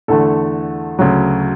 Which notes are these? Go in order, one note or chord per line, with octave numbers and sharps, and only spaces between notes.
E2 D3 A3 A4
D2 C#3 F#3